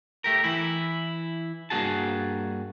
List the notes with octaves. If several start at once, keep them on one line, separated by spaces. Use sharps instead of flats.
A3 G4 A#4
E3 E4
G2 F#3 A#3 F#4 G#4 A5